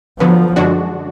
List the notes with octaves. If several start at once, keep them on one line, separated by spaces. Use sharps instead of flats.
D3 F3 F#3 B3
F#2 D3 G#3 D4 F#4